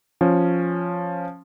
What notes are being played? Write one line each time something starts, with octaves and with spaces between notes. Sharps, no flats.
F3 C#4